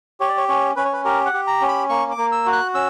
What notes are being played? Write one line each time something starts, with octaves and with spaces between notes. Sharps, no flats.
G4 C#5
D5
C#5
C#4 C#5
C#4 B4
C#5
B4
G4 A#4
F#5
G4
A#5
C#4
B5
A#3 C#6
D6
A#3
E6
F#4
F#6
C#4 E6